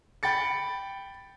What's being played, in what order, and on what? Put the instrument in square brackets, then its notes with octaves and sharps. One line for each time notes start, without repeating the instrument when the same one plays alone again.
[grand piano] G5 B5 A6 C#7